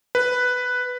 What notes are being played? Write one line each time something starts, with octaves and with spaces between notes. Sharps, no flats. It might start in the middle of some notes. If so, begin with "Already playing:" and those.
B4